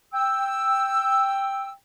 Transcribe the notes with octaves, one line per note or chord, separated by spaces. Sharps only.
G5 E6